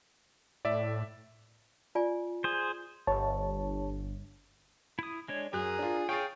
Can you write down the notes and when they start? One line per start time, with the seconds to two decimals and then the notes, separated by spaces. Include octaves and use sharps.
0.65 A2 D5 E5
1.95 F4 D5 G#5
2.44 G#4 C5
3.07 G1 C#5 A5
4.99 E4 D#6
5.28 G#3 D4 C#5
5.53 F#2 G#4 A#4 F#6
5.79 D4 F4
6.09 G#4 C#5 F5 G5 A6 C7 D7